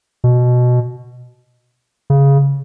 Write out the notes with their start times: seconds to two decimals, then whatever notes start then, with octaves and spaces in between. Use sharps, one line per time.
0.24 B2
2.10 C#3